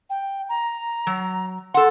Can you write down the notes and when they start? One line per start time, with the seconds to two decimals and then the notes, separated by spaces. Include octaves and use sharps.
0.10 G5
0.49 A#5
1.07 F#3
1.74 A4 F#5 C6